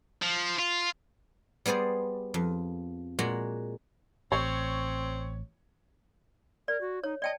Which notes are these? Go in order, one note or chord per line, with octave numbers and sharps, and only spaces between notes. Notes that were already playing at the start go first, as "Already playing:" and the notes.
F3
F4
G3 B3 G#4 C5 D5
F2
A#2 G#3 F#4 F#5 A#5
A1 C4 C#5
A#4 D5
F#4
D#4 C#5
D5 D#5 G5 A5